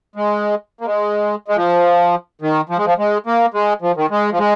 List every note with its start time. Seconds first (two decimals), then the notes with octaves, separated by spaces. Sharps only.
0.16 G#3
0.81 A#3
0.86 G#3
1.48 G#3
1.56 F3
2.42 D#3
2.69 F3
2.77 G#3
2.85 F3
2.98 G#3
3.26 A#3
3.54 G#3
3.82 F3
3.96 D#3
4.10 G#3
4.32 F3
4.39 G#3